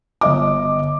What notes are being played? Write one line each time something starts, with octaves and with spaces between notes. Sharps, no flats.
G1 D#5 D6